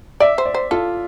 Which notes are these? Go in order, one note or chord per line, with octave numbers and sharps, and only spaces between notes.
D5 E5
C5
D5
C5
F4 A4